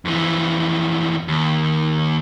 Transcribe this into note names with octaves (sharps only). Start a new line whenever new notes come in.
F2 E3
D#2